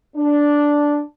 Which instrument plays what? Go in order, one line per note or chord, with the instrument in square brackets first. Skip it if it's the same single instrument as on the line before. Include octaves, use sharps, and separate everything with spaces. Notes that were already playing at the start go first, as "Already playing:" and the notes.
[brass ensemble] D4